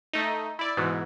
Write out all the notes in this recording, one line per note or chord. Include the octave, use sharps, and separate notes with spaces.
A3 D#4
E4 D5
G#2 B2 E3